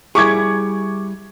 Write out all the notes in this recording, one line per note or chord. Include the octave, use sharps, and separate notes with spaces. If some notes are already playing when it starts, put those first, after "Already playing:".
G3 E4 G#4 C#6 D6 G#6